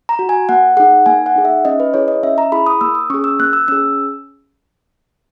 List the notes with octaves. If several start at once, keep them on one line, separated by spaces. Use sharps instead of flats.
A#5
F#4
G#5
A#3 F#5
D#4 G#4 F#5
A#3 G#5
F#5
D#4 G#4
E5
C#4 D#5
B4
E4 G#4 C#5
D#5
C#4 E5
A#5
E4 G#4 B5
D#6
A#3 E6
D#6
C#4 G#4 C#6
E6
A#3 F#6
E6
C#4 G#4 E6